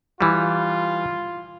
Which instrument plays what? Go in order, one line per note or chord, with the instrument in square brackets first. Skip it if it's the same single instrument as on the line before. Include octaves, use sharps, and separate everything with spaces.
[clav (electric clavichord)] E3 G3 [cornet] F4